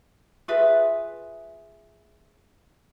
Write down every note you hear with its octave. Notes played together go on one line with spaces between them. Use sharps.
F4 G#4 B4 E5